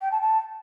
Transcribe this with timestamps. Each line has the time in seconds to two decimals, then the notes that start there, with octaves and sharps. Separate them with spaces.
0.01 G5
0.11 A5
0.21 A5